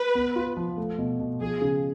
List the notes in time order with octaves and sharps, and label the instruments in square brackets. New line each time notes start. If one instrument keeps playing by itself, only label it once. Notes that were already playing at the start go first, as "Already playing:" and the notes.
Already playing: [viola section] B4
[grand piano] B3
F4
F3
A3
B2
B2
[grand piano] F3 [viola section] G#4
[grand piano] C#3